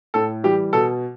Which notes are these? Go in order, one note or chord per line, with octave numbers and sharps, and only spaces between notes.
A2 A4
E3 G3 G4
B2 A4